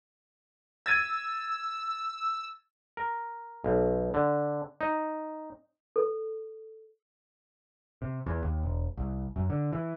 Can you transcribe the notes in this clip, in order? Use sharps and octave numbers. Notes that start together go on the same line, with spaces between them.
E6 G#6 A6 D#7
A#4
B1
D3
D#4
A4
C3
E2
D#2
E1
C2
F#2
D3
E3